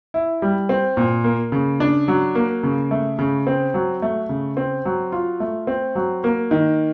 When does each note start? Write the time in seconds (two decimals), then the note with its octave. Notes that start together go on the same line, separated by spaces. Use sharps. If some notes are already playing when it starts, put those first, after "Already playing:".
0.14 E4
0.42 G3
0.69 C4
0.97 A#2
1.24 A#3
1.52 C#3
1.80 D4
2.08 F#3
2.35 A#3
2.63 C#3
2.91 A3
3.19 C#3
3.47 C4
3.74 F#3
4.02 A3
4.29 C#3
4.57 C4
4.85 F#3
5.12 F4
5.40 A3
5.67 C4
5.95 F#3
6.24 A#3
6.51 D#3